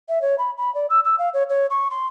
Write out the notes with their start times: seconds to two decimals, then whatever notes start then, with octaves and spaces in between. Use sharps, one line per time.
0.09 E5
0.22 C#5
0.38 B5
0.58 B5
0.75 D5
0.90 E6
1.05 E6
1.19 F5
1.34 C#5
1.49 C#5
1.70 C#6
1.91 C6